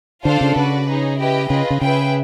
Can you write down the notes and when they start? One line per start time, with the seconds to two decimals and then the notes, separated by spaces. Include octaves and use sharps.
0.24 D3 D4 F4 A4 C5 F5
0.41 C#3
0.56 C#3 F#4 B4 D5
0.88 D#4 G#4 C#5
1.19 E4 G4 B4 D#5 G5
1.50 C#3 F4 G#4 B4 D#5
1.70 C#3
1.81 C#3 G#4 B4 E5 G5